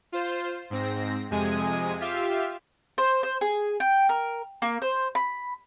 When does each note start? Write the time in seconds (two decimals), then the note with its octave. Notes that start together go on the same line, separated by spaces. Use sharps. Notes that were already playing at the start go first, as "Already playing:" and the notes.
0.12 F4 C5
0.70 G#2 C4 A#6
1.31 F2 C3 G#3 G#5 D#6
2.00 F4 G4 E5 F5
2.98 C5
3.23 C5
3.41 G#4
3.80 G5
4.09 A#4
4.62 A#3
4.82 C5
5.15 B5